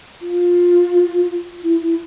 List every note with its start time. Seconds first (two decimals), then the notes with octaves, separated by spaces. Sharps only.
0.22 F4
1.63 E4
1.81 E4